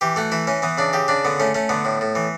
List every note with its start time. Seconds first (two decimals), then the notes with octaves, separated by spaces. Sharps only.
0.01 E3 G4
0.16 A3 F#4
0.32 E3 E4
0.47 E3 C#4
0.62 E3 B3
0.78 C#3 D4
0.93 C#3 G4
1.08 C#3 D4
1.25 D3 B3
1.40 A3 C#4
1.55 A3 C#4
1.69 D3 B3
1.85 A2
2.01 A2
2.15 E3